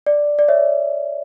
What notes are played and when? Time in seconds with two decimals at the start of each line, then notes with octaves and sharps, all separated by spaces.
0.06 D5
0.39 D5
0.48 C#5 E5